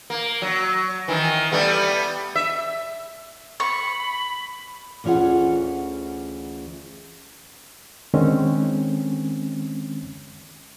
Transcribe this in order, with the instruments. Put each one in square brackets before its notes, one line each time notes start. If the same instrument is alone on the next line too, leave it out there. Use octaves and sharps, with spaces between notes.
[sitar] A#3
F#3
D#3 E3
G3 A3 B3
E5
[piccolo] B5 [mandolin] C#6
[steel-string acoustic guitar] D2 E3 C#4 F4 G#4 F#5
[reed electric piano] D3 D#3 G#3 C4 C#4